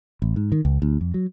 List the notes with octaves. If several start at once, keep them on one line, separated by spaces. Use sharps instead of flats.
A1
G#2
D#3
C#2
D2
F2
F#3